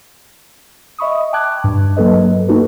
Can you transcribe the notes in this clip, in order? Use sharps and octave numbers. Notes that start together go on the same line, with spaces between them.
D#5 E5 B5 C#6 D#6
G5 A5 D6 F#6 G#6
G2
F#3 A#3 A4 B4 D#5
A#3 D#4 F#4 A4 B4